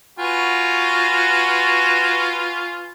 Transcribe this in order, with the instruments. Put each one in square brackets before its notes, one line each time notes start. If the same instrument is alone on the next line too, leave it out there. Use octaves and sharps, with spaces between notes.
[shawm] F4 [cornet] F#4 [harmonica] B4 G#5 C#6